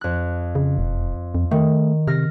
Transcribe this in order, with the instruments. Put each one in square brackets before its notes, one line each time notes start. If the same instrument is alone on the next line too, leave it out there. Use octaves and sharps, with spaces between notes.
[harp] F2 F#6
[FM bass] C#3
E1
F2
[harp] D#3 [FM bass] A3
[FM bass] C3 [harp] F6 A#6